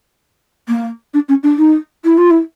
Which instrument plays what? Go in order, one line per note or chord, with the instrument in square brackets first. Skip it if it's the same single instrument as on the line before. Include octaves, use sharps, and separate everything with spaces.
[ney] A#3
D4
C#4
D4
D#4
E4
F4
E4